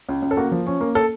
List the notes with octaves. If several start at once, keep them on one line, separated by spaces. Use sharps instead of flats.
C#2
C#2
A4
A#3 F#4
F3
C#4
A#3
A4